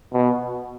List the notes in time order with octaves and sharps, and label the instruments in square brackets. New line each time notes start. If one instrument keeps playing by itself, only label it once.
[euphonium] B2